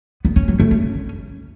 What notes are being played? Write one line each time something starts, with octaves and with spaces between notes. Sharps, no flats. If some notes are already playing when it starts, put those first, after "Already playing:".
B3
C#4
F#3
A3
C#4